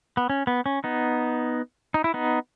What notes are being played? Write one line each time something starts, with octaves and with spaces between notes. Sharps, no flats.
B3
C#4
B3
C#4
B3 D#4
D#4
E4
B3 D#4